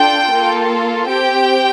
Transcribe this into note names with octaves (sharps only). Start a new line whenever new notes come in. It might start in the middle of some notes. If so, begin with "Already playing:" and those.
Already playing: D4 F4 A4 G5
A#3 F4 A4
C4 G4 G5